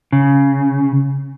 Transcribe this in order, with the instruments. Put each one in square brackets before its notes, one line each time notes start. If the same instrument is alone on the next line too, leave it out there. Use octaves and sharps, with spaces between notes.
[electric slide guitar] C#3